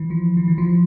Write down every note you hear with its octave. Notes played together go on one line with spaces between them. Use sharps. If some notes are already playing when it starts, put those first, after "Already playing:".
Already playing: E3
F3
E3
E3
F3